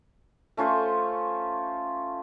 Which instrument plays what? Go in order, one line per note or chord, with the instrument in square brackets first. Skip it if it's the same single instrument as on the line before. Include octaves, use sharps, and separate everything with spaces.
[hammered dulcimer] A3 C#4 F4 C5